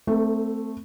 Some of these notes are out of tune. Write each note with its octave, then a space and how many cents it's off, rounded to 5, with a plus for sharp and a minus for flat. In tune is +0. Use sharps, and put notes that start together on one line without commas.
A3 +0 C4 -15 A4 +40